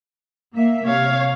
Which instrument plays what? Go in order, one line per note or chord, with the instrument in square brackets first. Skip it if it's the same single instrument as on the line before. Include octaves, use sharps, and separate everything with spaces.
[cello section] A#3 E5
[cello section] C3 [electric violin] C#5 F5